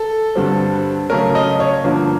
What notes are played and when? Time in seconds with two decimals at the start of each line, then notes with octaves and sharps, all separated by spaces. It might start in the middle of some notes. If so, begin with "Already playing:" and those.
Already playing: A4
0.35 G2 D3 G3 C4
1.10 C#3 F#3 A3 C#4 A#4
1.35 D#5
1.60 C#5
1.84 G2 D3 F3 A#3